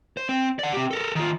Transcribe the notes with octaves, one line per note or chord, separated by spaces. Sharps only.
C5
C4
D5 F#5
C4 G4
A4 A#4
D#3 F4